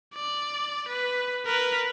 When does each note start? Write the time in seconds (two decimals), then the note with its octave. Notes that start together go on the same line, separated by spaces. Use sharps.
0.14 D5
0.88 B4
1.46 A#4 B4